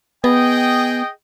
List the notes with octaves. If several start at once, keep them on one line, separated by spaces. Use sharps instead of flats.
B3 G#4 D#5 G5